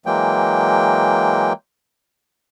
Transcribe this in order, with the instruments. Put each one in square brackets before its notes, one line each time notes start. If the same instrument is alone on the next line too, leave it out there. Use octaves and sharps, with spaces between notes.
[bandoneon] E3 F#3 G#3 A#3 G5